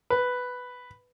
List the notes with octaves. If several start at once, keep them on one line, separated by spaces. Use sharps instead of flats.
B4